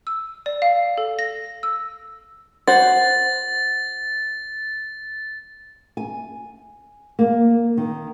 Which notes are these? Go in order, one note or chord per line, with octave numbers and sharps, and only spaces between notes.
E6
D5
F5
A4
A#6
E6
F#4 C5 A6
G#5
A#3
D#3